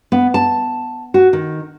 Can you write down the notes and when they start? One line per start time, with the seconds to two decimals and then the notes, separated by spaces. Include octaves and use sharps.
0.12 B3
0.34 A5
1.14 F#4
1.33 D#3